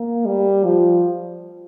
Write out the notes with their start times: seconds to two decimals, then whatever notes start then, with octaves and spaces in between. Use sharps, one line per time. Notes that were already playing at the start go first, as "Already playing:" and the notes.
Already playing: A#3
0.26 G3
0.65 F3